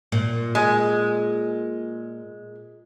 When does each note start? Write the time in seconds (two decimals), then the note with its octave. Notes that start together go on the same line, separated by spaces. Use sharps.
0.12 A#2
0.55 G#3